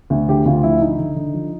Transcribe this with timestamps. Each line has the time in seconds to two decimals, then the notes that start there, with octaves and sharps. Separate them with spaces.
0.10 D2
0.28 D3 G4
0.46 D2 F4
0.63 F3 E4
0.81 D3 D#4
0.99 D3
1.16 D3
1.34 F3